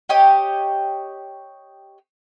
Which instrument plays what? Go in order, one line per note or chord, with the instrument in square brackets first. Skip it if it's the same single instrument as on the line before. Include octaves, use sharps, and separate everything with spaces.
[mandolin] G4 C#5 D#5 G5